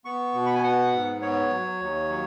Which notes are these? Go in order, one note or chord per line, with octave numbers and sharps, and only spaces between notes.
B3 C#6
B2
B5
G#5
B3 F#5
G#2
B3 C#5
F#3
D#2
F#3